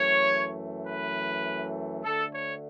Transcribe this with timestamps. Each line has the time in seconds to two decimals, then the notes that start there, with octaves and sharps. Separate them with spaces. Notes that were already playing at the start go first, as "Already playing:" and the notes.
Already playing: F#2 E3 A3 C#5
0.87 B4
2.04 D2 D3 A3 A4
2.33 C#5